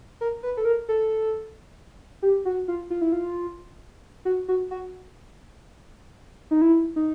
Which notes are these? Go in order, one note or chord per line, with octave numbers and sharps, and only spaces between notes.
A#4
B4
A4
A#4
A4
G4
F#4
F4
F4
E4
F4
F#4
F#4
F#4
D#4
E4
D#4